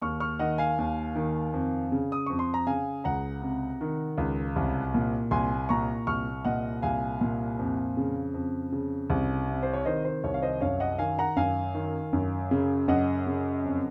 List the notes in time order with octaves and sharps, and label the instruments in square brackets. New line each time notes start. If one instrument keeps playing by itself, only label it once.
[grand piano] D#2 C#6 F6
C#6 F6
D#3 D#5 F#5
F5 G#5
D#2
D#3
F2
C#3
D#6
F2 C#6
C6
A#5
C#3 F5 G#5
C#2 F#5 A#5
C3
D#3
C#2
C2
A#2
C2 G#5 C6
A#2 A#5 C#6
C2 C#6 F6
A#2 D#5 F#5
C2 F5 G#5
A#2
F2
C#3
F2
C#3
C2
C3
C5
C#5
D#3 C5 D#5
C5
C2 C#5
F5
C5 D#5
F#2 C#5 F5
D#5 F#5
D#3 F5 G#5
F#5 A#5
F#2 F5 G#5
D#3
F#2
C#3
F#2 D#5 F#5
C#3
F2